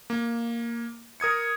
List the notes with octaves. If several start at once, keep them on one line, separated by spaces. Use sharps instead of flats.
A#3
A#4 D#6 G#6 C#7